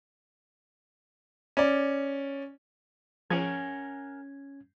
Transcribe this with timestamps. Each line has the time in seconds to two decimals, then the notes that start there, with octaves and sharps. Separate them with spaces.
1.57 C#4 D5
3.30 F3 C#4 G#4 A#4 F#5 G#5 G#6